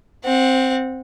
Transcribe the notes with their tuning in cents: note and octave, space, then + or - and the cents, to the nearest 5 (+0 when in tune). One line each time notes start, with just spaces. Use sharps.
C4 +0 F#5 -20